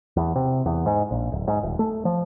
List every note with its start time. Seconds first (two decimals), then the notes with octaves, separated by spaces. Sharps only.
0.17 E2
0.36 C3
0.66 E2
0.86 G#2
1.11 A#1
1.32 D1
1.48 G#2
1.63 D#1
1.79 A3
2.05 F3